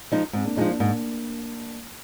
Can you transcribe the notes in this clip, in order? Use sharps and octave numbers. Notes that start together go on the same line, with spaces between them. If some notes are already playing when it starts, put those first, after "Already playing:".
F3 G#3 D#4
G#2 G#3 C4
A#3 D4
F3 G#3 D4 D#4 F4
A#3 D4
G#2 A#3 D4